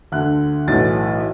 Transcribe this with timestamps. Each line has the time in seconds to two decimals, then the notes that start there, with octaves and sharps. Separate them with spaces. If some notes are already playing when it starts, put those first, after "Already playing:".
0.12 D2 D3 F#6
0.67 B1 A2 E3 A6